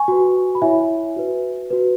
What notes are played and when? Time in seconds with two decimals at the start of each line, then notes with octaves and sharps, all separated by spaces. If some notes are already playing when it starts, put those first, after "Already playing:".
Already playing: G#5 C#6
0.08 F#4 B4
0.55 B5
0.62 E4 C#5 E5 G#5
1.16 F#4 B4
1.71 F#4 B4